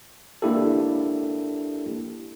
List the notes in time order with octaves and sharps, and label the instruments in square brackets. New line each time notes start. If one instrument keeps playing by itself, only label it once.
[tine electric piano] A#3 D4 E4 G4 A4